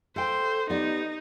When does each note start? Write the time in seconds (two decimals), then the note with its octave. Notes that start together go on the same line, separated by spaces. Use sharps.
0.16 A4 C5 F5 G5
0.70 B3 D#4 G4 D5